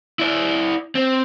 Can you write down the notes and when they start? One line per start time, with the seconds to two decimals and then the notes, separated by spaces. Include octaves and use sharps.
0.20 E4 D5
0.95 C4